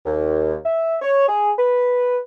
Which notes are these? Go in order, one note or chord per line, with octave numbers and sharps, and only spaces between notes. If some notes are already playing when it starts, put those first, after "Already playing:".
D#2
E5
C#5
G#4
B4